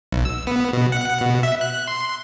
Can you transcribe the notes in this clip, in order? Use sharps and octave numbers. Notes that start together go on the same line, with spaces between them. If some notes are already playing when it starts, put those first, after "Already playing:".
B1
E6
B3
B2
F#5
B2
E5
F#6
C6